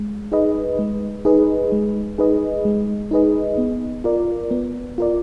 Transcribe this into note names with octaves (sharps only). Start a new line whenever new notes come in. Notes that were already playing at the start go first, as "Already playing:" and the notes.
Already playing: G#3
D#4 G#4 B4 D#5
G#3
D#4 G#4 B4 D#5
G#3
D#4 G#4 B4 D#5
G#3
D#4 G#4 B4 D#5
B3
F4 A#4 D5
B3
F4 A#4 D5